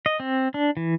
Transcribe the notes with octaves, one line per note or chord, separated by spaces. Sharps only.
D#5
C4
D4
E3